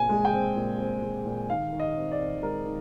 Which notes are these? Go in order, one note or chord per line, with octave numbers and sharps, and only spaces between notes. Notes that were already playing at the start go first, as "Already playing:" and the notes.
Already playing: A#2 C4 G#5
G#3
G5
C4
A#2
C4
G#3
A#2
D#3 F5
D#3
D#5
C4
D5
C4
G#3 A#4
D#3